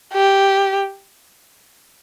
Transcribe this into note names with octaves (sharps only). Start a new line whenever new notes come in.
G4